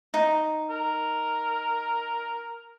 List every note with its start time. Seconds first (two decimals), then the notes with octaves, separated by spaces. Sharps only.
0.14 D#4
0.70 A#4